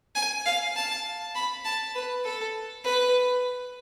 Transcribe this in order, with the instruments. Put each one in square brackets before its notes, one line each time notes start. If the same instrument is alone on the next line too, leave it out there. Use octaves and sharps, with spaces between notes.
[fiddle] G#5
F5
A5
B5
A5
B4
A4
B4